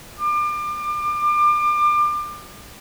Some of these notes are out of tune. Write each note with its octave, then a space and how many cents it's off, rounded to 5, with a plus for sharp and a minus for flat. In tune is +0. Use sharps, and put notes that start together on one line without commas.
D6 +30